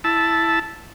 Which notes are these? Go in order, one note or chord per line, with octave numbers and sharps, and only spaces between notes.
E4 A5